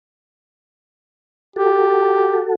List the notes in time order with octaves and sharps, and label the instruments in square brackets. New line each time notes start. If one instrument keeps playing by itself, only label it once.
[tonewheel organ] F#4 A4 [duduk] G4